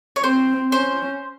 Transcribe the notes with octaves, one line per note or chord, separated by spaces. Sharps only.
C#5
C4 C5
C#4 C5